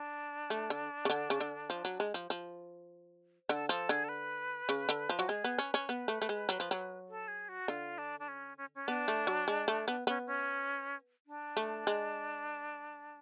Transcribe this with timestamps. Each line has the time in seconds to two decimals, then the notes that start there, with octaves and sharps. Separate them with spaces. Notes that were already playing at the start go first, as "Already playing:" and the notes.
Already playing: D4
0.50 A3
0.70 D3
1.05 C#3
1.10 D3
1.30 C#3
1.40 D3
1.70 F3
1.85 F#3
2.00 G#3
2.14 F3
2.30 F3
3.49 D3 A4
3.69 F3 A4
3.89 D3 G#4
4.04 A4
4.09 B4
4.69 C#3
4.89 D3
5.09 F3
5.19 F#3 F#4
5.28 G#3 G#4
5.44 B3
5.58 C#4 B4
5.74 C#4
5.89 B3 B4
6.08 A3
6.22 A3
6.29 G#3
6.49 F#3
6.60 F3
6.71 F#3
7.09 A4
7.28 G#4
7.49 F#4
7.68 D3 F4
7.98 D4
8.20 D4
8.28 C#4
8.57 C#4
8.75 C#4
8.87 B3 D4
9.08 A3
9.27 F#3
9.48 G#3
9.68 A3
9.88 B3
10.07 B3 C#4
10.27 C#4
11.26 D4
11.57 A3
11.87 G#3